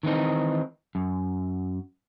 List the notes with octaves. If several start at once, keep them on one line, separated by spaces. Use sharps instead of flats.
D#3 E3 C4 D#4
F#2